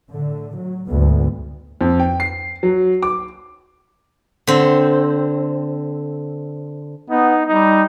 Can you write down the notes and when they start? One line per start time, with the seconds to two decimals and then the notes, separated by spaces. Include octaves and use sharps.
0.10 A2 D3
0.57 F#3
0.89 D2 G#2 B3
1.81 F2
2.00 G5
2.20 C7
2.63 F#3
3.03 D6
4.47 D3 C4
7.10 B3 D#4
7.47 G3 D#4